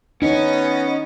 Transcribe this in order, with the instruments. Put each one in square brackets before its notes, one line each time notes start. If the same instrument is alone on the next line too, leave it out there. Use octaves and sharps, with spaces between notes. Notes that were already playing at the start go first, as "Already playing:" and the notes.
[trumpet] B3 [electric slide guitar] C#4 C#5 [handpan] D#4 [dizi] D#5